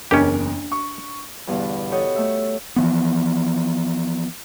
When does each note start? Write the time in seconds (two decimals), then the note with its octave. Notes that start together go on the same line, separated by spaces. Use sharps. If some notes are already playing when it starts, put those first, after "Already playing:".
0.11 F#1 E2 C#4 D4 G4 A#4 D#5
0.72 C#6
1.47 E2 G2 B2 D3
1.92 G4 A4 C#5 D#5 F#5 G6
2.15 A3 E5
2.76 E3 F3 B3